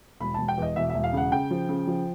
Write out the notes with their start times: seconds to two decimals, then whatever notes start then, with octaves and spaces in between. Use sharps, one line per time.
0.21 E1 B5
0.34 E1 A5
0.48 G5
0.58 E2 D#5
0.76 E1 E5
0.90 E1 E5
1.04 F5
1.13 C#3 F#5
1.32 C#3 G5
1.51 F3
1.69 C#3
1.87 F3